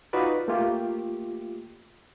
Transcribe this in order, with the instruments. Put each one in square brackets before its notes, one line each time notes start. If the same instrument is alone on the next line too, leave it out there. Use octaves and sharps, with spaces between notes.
[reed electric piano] D#4 F4 F#4 B4 D5
A3 A#3 F4 G4